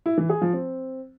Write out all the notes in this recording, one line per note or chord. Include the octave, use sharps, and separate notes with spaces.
E4
E3
G#4
F3
C4